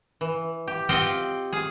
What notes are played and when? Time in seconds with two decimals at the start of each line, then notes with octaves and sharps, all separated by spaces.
0.21 E3
0.68 G4
0.89 C4 F4 G4 D#5 F#5 G5
1.53 G#4 F5